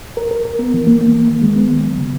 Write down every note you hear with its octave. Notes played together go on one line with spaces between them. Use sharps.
A#4
A#4
A#4
B3
E3
A#3
A#3
A#3
D#3
G#3
B3
D#3
F#3
C#3